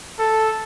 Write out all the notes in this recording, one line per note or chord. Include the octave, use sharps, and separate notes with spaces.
A4